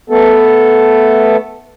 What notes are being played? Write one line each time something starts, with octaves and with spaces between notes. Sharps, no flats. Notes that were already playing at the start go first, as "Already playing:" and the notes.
A3 B3 A4